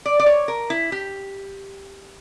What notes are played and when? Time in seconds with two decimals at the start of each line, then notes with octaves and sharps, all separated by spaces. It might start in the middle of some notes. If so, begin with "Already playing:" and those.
0.06 D5
0.19 D5
0.26 C#5
0.48 A#4
0.70 E4
0.92 G4